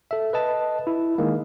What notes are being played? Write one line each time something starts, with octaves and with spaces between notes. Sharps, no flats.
A4 E5
B4 D#5 A5
E4
D#3 G#3 A#3